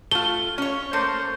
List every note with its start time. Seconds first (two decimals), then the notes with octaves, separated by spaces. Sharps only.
0.11 A3 F4 G7
0.58 C#4 C#5
0.93 A3 A#3 C5